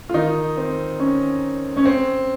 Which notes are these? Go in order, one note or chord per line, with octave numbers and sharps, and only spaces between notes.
F4
D#3 D#4
C4
C#4
C#4
C4